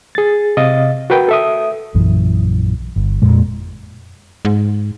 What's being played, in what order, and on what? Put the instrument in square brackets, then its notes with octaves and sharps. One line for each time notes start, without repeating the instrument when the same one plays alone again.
[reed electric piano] G#4 A6
C3 D#5 F5 A6
F#4 A#4 B4 G5
A4 E5 D#6
[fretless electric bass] A#1 F#2 E3
G1
F2 A#2 G#3
[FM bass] G#2